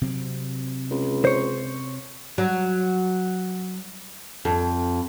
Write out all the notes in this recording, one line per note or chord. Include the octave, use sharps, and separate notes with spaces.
C3 F#3 C4
C#2
C5 C#5
F#3
F2